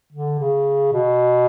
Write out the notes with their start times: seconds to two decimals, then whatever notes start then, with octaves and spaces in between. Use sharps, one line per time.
0.12 D3
0.39 C#3
0.93 B2